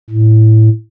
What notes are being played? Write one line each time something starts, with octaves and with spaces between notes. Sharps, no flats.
A2